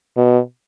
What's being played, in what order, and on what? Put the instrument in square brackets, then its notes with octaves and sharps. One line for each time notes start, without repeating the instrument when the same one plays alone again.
[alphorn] B2